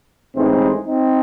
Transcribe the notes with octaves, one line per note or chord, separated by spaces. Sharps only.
A1 A2 E3 G#3 C4 D#4
C4 D#4